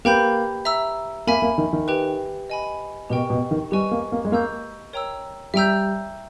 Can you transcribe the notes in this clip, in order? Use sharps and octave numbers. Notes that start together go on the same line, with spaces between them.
A#3 G4 B4 G5 B5 G6
E5 A#5 E6
A#3 E5 G#5 B5
A#3
D#3
D#3
G4 B4 G5
D#5 G#5 B5
B2 G4 A#4 D#5 G5 C#6
B2
D#3
G3 G4 B4 D#5 G#5 C#6
A#3
A#3
G#3
A#3 D#5 A#5 C#6 E6 G6
A#4 C#5 G5 A#5 E6
G3 E5 G5 A#5 E6 G6